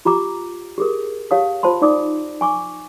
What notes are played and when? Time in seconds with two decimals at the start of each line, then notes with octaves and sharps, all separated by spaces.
0.05 F4 G4 A#5 D6
0.78 G4 G#4 A#4
1.31 G4 C#5 F5 A5 D#6
1.63 F4 C5 A5 B5 C6
1.82 D#4 D5 D6 D#6
2.41 G#5 C#6 D6